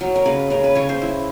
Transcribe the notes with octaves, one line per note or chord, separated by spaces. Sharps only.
F#3
A#4
C#3 B4
C#3 A#4
B4
C#3 C#5
C5
E4